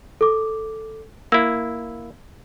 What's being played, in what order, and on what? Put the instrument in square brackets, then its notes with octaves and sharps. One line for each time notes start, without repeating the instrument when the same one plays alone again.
[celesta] A4 D6
[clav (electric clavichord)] A#3 E4 [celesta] E6